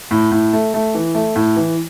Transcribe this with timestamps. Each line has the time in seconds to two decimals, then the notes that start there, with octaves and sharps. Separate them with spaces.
0.11 A2
0.31 A2
0.53 A3
0.74 A3
0.95 E3
1.15 A3
1.36 A2
1.57 E3